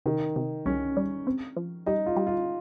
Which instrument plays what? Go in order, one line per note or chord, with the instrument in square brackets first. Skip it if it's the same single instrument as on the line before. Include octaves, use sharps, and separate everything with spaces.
[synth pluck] C3 [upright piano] D#3
[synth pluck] C3
[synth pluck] C2 [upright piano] C#4
[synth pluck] G3
C4
F3
[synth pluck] G3 [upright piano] D#4
[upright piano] F4
[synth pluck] G3
[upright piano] F4